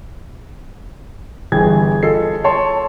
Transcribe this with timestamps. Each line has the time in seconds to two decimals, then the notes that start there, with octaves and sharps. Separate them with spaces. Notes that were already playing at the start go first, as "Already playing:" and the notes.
1.52 G1 G2 E3 G#4 G5 G#6
2.03 F4 A4 D#5 C7
2.44 C#5 A5 C6